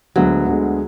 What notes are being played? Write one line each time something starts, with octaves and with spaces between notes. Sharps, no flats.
D2 D3 F#3 G#3 B3
D2 D3 G#3 B3